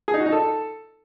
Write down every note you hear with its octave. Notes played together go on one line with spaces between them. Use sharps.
G#4
D#4
F#4
D#4
A4